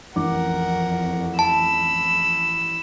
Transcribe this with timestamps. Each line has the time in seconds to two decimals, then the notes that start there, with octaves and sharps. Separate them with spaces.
0.16 A1 F2 A#4 F#5 D6
1.39 A5 B5 E6